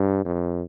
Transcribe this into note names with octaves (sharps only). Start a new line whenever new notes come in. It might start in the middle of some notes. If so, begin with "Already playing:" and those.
Already playing: G2
F2